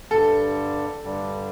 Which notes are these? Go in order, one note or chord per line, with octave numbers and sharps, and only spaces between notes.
G2 D3 G3 A4
G2 D3 G3